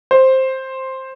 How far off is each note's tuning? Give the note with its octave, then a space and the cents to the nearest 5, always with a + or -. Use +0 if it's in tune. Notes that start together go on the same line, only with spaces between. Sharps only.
C5 +5